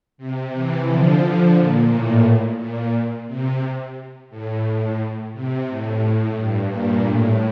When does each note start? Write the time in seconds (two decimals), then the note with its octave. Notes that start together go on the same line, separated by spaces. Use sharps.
0.18 C3
0.52 C3 E3
0.86 D3 F3
1.56 A#2
1.89 A2
2.58 A#2
3.27 C3
4.30 A2
4.65 A2
5.33 C3
5.67 A2
6.36 G2
6.71 A#2
7.05 A2